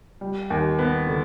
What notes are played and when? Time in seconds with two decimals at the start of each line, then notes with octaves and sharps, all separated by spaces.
0.21 G3
0.50 D#2
0.79 B3
1.07 D3